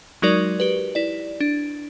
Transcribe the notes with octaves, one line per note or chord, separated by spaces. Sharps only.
F#3 G#3 D#4 F#4 A#4 D5
G4 B4
E4 D5
D4